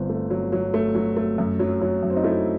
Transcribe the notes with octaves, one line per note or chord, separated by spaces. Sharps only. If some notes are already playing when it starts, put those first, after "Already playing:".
Already playing: G1 G2 C4
A3
F#3
F#3
A3
F#3
A3
F#2
F#3
F#3
F#2
C4
D#4
A3 E4